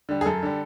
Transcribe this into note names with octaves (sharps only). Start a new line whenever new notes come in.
D3 G3
G#4
F#2 A4
D3 G3